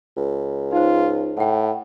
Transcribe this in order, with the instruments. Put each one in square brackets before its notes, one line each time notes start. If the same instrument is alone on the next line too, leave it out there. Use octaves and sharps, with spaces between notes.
[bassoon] C#2
[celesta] D#4 C5 [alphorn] F4
[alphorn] A2 [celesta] F#5 G5